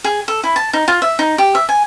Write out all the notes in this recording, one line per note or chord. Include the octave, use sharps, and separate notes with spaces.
G#4
A4
E4
A5
D#4
F4
E5
D#4
G4
E5
G#5